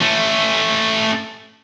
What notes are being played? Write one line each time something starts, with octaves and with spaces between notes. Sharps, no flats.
A3 C#4